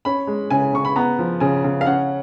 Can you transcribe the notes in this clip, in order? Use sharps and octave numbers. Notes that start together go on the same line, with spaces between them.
C#4 B5
G#3
C#3 G#5
C#3 C#6
B5
B3 A#5
F3
C#3 G#5
C#3
F5
C#4 F#5